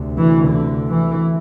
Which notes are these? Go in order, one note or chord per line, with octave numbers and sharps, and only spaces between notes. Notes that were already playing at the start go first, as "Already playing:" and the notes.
Already playing: D2 C3
E3
D3
E3